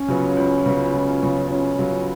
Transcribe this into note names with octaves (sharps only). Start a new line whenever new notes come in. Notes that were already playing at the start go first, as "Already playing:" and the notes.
Already playing: C#4
C#3 F#3 B3 F4
C#2
C#3 F#3 B3 F4
C#2
C#3 F#3 B3 F4
C#2 C#4
C#3 F#3 B3 F4